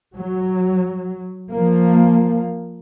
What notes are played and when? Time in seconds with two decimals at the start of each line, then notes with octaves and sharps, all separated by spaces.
0.15 F#3
1.51 F3 A#3